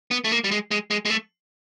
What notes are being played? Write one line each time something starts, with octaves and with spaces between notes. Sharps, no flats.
B3
A3
A#3
G3
G#3
G#3
G#3
G#3
A3